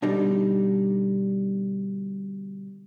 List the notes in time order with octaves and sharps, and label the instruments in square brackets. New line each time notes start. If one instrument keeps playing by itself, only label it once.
[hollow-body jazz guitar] B2 D3 G3 D#4